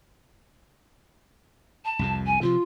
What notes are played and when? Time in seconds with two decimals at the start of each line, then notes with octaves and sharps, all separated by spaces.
1.84 A5
1.99 C2 F2 C3
2.26 G#5
2.41 C3 E3 F3 F4